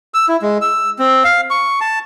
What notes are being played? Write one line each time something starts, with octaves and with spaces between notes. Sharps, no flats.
E6
E4
G#3
E6
C4
F5
C#6
A5